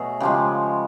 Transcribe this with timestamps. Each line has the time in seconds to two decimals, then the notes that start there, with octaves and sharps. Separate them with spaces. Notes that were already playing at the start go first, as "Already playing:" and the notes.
Already playing: B2 F#3 A3 G#4
0.20 C#3 F3 G#3 G4